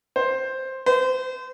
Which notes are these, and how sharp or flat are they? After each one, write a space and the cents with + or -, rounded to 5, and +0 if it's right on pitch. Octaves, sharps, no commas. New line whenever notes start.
C5 +5
C5 -30